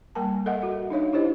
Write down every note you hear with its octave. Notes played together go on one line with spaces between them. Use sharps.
G3 A#3 A#4 G#5 A5
A4 A#4 D#5 E5 F#5
F#4 E5
D4 D#4 C#5 F5
D4 E4 G4 C5 D#5